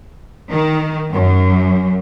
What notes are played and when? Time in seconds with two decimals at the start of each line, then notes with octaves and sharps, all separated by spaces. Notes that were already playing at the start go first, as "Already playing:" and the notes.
0.51 D#3
1.14 F#2